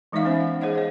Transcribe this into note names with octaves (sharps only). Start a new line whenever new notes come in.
E3 G#3 D#4 D5 E5 F5
G#3 B3 C#4 C5 B5
F#5
G#4 C5 C#5 D#5 F5 F#5
C5 D#5